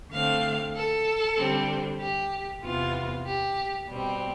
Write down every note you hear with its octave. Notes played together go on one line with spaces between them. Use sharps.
D3 A3 C4 F5
A4
D3 G3 C4
G4
E2 C3 E3 B3 F4
G4
B2 G3 C4